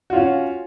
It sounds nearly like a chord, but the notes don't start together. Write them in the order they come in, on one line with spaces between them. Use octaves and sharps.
F#4 F4 C#4